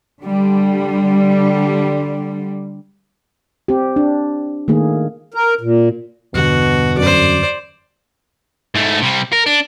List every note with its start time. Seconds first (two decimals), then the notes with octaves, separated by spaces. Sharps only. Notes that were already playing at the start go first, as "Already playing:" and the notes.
0.21 D3 G3
3.68 C4 G4
3.96 D4
4.68 D#3 A3 A#3 G#4
5.34 A#4
5.61 A#2
6.34 E2 G2 B2 D3 F#4
6.98 F#2 C5 D5
8.75 G#2 A3
9.02 C3 G3
9.33 A#4
9.46 D4